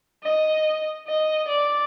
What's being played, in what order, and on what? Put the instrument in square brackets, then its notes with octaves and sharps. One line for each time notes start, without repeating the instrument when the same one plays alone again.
[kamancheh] D#5
D#5
D5